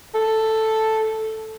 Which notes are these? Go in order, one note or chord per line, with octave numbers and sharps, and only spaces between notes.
A4